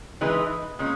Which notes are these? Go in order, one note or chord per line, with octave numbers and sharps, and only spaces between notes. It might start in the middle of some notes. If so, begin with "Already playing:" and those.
E3 G#3 D#4 G#4 B4
A#2 G#3 C#4